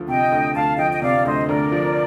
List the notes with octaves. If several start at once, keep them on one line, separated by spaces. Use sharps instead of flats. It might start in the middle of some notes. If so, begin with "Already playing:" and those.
Already playing: D2 F3
C3 D#5 G5
D2
D2 F5 A5
F3 D#5 G5
D#5
C3 D5 F5
D2 C5 D#5
D2 A#4 D5
F3